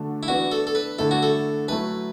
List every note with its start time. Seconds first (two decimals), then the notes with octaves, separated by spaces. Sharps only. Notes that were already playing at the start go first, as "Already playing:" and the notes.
Already playing: D3 A3 F#4 A4
0.23 E4
0.28 E3 B3 D4 F#4
0.52 A4
0.67 A4
0.75 B4
0.98 D3 A3 E4 A4
1.11 F#4
1.23 A4
1.68 F#3 A3 E4 A4 B4